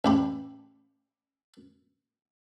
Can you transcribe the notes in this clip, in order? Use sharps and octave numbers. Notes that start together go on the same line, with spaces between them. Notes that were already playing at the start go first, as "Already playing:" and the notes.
A1 G4 B5